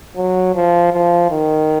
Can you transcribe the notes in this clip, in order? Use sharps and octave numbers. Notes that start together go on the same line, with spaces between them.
F#3
F3
F3
D#3